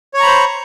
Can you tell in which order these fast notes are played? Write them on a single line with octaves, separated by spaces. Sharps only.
C#5 C#6 A#5 B5 C5